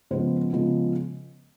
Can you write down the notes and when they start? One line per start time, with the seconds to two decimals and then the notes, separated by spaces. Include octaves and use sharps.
0.11 C#3 F3 G#3 B3 C5
0.53 C#3 F3 G#3 B3